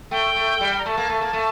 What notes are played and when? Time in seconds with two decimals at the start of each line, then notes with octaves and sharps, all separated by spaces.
0.11 A3 G5
0.36 A3
0.61 G3
0.78 A#5
0.85 A3 A5
0.97 A#3
1.09 A3
1.21 A#3
1.33 A3